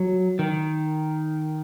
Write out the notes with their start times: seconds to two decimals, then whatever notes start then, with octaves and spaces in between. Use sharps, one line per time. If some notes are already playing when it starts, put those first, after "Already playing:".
Already playing: F#3
0.39 D#3